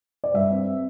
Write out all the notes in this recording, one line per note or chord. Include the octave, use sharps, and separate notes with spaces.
D5
G2 E5
C4